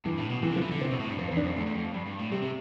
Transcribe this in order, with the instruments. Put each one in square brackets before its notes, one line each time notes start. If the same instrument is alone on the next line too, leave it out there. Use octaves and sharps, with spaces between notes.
[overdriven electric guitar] G2 [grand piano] E3
[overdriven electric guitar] A2
B2
[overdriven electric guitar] C3 [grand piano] E3
[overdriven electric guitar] D3 [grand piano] F3
[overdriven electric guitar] E3
D3
[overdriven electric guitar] C3 [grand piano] C4
[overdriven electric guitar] B2
A2
G2
[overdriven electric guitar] F2 [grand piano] C4
[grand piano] C4
[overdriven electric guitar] E2
[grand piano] D4
[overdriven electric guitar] F2 [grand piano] C4
[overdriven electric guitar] E2 [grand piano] A3
[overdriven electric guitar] E2
F2
G2
G2
A2
[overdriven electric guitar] C3 [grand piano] G3
[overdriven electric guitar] C3